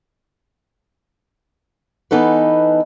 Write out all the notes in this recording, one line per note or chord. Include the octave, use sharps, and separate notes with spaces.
E3 B3 D#4 A4 B4